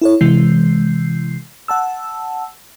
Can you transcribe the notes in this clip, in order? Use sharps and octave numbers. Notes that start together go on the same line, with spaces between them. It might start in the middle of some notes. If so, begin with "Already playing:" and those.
E4 A4 C#5
C3 E3 G#3 G6 C7
F#5 A5 E6